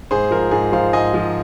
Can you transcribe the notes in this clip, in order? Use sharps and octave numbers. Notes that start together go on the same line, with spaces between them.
G#2 G#4 C5
F3 A#4
G#2 G#4
F3 C5 F5
G#2 D#5 G#5
F3